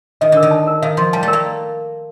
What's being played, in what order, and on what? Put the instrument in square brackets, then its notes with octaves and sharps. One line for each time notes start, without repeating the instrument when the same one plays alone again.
[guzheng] D#3 [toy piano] D#5
[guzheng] D3 [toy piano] A#4
[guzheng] D#3
[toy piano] A5
A#4
[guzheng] D#3 [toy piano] F5
[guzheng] F3 [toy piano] C6
[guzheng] G3 [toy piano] A5
[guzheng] A3
[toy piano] A#4
[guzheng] A#3